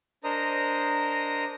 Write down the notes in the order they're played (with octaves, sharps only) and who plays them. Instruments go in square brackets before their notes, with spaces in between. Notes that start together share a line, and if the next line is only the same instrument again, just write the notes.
[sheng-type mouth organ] D4 A#4 C5 D#5 A#5 D#6